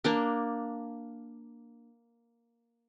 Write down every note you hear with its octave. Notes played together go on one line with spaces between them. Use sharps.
A#3 D4 A#4